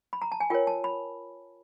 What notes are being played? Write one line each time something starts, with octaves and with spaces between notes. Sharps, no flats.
B5
A#5
A5
G#5
F4 A#4 C#5 G5
A5
B5